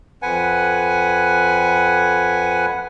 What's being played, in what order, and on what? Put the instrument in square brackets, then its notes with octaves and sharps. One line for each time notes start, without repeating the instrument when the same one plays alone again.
[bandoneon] F2 B4 F#5 G#5